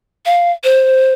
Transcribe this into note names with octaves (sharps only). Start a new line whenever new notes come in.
F5
C5